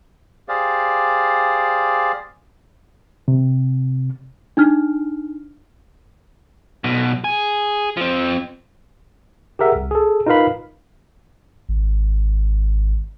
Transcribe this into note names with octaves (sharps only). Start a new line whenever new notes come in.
G4 G#4 C5 D5 F5
C3
D4 D#4 F6
B1 B2
G#4
F3 C4
G4 G#4 A#4 E5 F#5
C2
G#4 A4
D#4 F4 A#4 B4 F5 B5
G#1